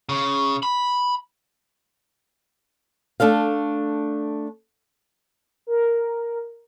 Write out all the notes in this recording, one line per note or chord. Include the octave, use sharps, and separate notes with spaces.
C#3
B5
A3 D4 A4 F5
A#4